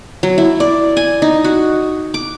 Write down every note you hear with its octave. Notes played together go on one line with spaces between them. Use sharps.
F#3
E4
D5
G#5
D#4
F#4
D6